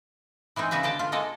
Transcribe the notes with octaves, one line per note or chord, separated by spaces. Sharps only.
E3 G#3 C4 D#4
C#3 B3 F#4 B4 E5
B2 D3 G5 A5
F4
G#3 A#3 A4 D#5